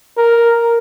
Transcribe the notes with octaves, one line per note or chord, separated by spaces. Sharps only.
A#4